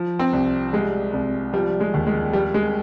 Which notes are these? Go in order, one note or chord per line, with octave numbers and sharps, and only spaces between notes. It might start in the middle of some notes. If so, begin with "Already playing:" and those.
Already playing: F3
C4
C2
G3 G#3
C2
F3 G3
G#3
D#2
G#3
G3
G#3